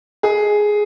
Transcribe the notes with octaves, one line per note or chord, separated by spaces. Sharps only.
G#4